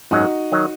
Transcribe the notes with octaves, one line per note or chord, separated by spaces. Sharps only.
G#1 F#2 D#3 F#3 D#4 F#4
D#3 F#3